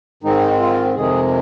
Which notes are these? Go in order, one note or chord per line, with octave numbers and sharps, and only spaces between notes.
G#2 D#3 G#3 C4 D#4
F4
F2 C3 D#3 G#3 G#4